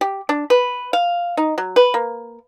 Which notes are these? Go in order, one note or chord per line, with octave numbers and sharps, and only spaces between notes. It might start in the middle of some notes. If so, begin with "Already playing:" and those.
G4
D4
B4
F5
D#4
F#3
B4
A#3